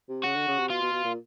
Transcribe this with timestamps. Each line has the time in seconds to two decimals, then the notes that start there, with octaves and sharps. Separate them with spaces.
0.09 C3
0.24 C#3 F#4
0.35 D3
0.48 C#3
0.58 C3
0.70 B2 F4
0.82 B2
0.93 B2
1.04 A#2